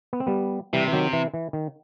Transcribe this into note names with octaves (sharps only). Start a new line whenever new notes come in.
B3
C4
G3 B3
C3 E3 G3
E3
D#3 F#3
E3
E3
D#3